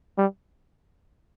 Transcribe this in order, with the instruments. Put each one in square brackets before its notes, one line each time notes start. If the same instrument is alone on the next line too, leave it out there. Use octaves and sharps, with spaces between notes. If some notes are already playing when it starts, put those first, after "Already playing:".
[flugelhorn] G3